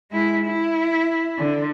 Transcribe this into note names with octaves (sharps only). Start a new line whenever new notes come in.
G#3 E4
E4
D3